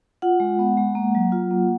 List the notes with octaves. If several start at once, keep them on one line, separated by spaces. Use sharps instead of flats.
F4 F#5
G#3
B3
G#3
A#3
F#3
F4
A#3